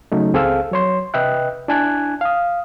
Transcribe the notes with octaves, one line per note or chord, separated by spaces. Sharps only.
C#3 F#3 A3 D#4
C#2 C4 G#4 A4 F5 E6
F#3 C#5 C6
C3 B4 D#5 E5 G5 F#6
D4 E4 G#5 A5 F#6 G#6
F5 D#6